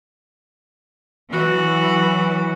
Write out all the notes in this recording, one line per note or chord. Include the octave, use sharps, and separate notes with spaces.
E3 F#3 F#4